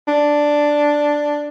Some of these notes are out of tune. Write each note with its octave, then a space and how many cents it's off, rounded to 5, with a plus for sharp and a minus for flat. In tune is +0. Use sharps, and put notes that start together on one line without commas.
D4 +0